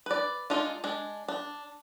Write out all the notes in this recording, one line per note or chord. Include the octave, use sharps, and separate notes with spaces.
B4 D5
G#3 D4 D#4 F4
G#3 D4
D4